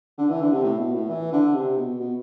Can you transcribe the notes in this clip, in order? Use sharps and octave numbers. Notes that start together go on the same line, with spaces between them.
D3
E3
D3
C3
A2
B2
A2
E3
D3
C3
B2
B2